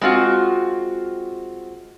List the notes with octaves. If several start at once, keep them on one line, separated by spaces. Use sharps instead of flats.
G#3 C4 F4 F#4